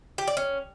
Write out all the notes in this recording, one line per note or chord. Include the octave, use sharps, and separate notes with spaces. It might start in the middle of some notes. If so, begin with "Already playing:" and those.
G4
D5
C#4